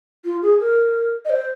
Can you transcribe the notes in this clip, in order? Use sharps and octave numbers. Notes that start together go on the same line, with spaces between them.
F4
G#4
A#4
D#5
C5